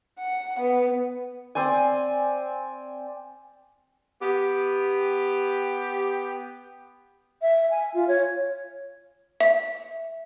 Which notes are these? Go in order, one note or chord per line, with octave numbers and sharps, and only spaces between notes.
F#5
B3
C4 C5 D5 G#5
B3 G4
E5
G#5
F4
C#5
E5